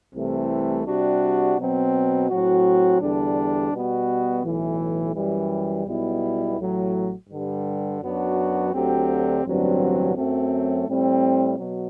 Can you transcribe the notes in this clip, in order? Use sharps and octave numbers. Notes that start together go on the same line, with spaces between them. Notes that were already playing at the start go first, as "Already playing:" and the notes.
C2 C3 E3 A3
C3 G3 D4 F#4
B2 F#3 C4
A2 F#3 C4 F#4
E2 D3 G3 D4
B2 G3 B3 F#4
B1 A2 E3
F#2 E3 G3
B1 B2 G3 B3 E4
A1 A2 F#3
G2 D3 G3
F#2 F#3 B3 D4 F#4
D2 D3 F#3 C4 G4
A1 G2 D3 F#3 C4
F#2 F#3 A3 C4
A2 G3 C4
B2 F#3